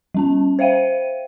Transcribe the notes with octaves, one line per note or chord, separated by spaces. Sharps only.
G3 C#4 A5
C5 E5 F5 G5 D#7